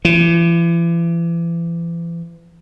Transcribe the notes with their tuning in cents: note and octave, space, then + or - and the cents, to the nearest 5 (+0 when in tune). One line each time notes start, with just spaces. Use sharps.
E3 +40